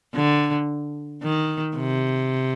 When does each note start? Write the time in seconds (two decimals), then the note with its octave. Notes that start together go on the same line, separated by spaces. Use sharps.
0.15 D3
1.23 D#3
1.76 C3